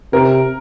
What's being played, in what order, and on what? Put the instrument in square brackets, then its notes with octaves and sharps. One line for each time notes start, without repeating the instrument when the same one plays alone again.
[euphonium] C3 [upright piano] A#4